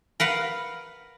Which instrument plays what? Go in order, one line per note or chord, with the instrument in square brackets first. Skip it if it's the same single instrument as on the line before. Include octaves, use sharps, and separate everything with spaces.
[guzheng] A#4 B4 F5 F#5